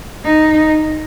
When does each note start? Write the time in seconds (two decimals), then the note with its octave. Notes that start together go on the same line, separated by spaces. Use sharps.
0.24 D#4